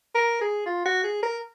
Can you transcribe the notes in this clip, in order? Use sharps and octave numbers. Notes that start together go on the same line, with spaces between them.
A#4
G#4
F4
F#4
G#4
A#4